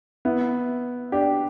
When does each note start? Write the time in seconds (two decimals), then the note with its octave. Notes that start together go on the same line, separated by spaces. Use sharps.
0.25 B3 E4
1.12 D4 G4